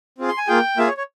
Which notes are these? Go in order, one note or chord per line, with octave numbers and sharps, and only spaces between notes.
C4 F4 G#4
C6
G#5
A#3 F4 G#4 G5
A#3 F4 G#4 E5
C#5
C#5